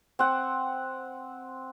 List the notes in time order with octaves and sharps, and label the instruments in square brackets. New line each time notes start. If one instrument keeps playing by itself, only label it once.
[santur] C4 F#5